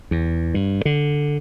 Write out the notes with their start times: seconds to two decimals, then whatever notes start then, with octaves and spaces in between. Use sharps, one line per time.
0.11 E2
0.54 G2
0.85 D3